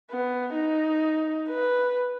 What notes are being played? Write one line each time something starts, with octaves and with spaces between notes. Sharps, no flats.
B3
D#4
B4